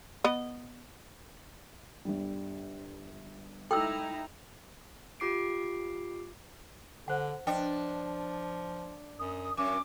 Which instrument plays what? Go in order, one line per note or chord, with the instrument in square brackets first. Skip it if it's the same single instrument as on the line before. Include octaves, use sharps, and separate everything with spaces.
[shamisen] B3 D#5
[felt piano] G1 D3 G3
[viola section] D#4 E4 A#5 [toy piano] A4 E6 [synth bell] G5
[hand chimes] F4 G4 D6 C7 D7
[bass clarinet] D3 [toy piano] C5 F#5
[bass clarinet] F3 [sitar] D4 [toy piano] B4 D#5 G5
[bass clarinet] F#2 [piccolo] D#6
[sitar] F#2 [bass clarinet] C#4 [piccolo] D6